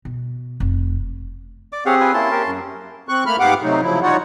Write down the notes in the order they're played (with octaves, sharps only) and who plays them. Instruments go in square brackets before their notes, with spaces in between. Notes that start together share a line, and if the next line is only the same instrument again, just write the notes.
[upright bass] B2
F1
[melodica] D5 D6
[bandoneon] C4 G4 G#4 [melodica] C#5 F5 F#5
[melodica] F4 B4 G#5
[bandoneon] A#3 E4 [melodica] C#4 A5 C6
[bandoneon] G4 A#4
F#2
[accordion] C4 C#6 F#6
A3 A#3 B5 F6
G#2 B3 G4 F5 F#5 D6
C3 F#3 A3 D#4
C#3 F3 F#3 E4
G3 D#4 F4 F#4 C#5 F#5